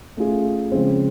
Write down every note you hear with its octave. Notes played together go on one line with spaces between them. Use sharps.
A3 C#4 F4 G#4
C#3 F3 G#3 C4